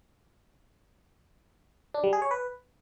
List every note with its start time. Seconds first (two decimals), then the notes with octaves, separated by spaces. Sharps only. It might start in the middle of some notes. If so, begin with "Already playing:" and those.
1.94 D4
2.04 G3
2.13 G#4
2.22 C#5
2.31 B4